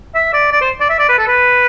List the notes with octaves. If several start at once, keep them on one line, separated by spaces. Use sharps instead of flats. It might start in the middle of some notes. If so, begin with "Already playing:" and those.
E5
D5
D5
C5
D5
E5
D5
B4
A4
B4